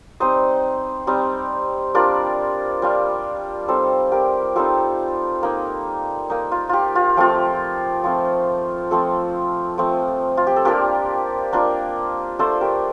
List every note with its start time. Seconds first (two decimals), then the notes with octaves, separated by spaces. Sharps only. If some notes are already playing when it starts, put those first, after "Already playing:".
0.20 G3 C4 D#4 C5 D#5
1.07 G3 C4 D#4
1.94 G3 D4 F4 A#4 D5
2.82 G3 D4 F4
3.68 G3 C4 D#4 A4 C5
4.12 G4 A#4
4.56 G3 C4 D#4 F4 A4
5.43 A#3 D#4
6.30 A#3 D#4
6.51 F4
6.69 F4 G4
6.95 F4
7.17 F3 A3 C4 F4 G4
8.04 F3 A3 C4 F4
8.91 F3 A3 C4 F4 A4
9.78 F3 A3 C4
10.37 F4
10.47 G4
10.56 A4
10.65 A#3 D4 F4 G4 A#4
11.53 A#3 D4 F4
12.39 A3 D4 F4 A4 C5
12.61 G4 A#4